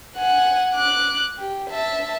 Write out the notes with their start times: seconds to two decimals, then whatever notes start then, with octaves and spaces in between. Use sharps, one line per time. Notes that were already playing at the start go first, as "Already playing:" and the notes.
0.17 F#5 G#5
0.75 D6 F#6
1.39 G4
1.70 E5 A5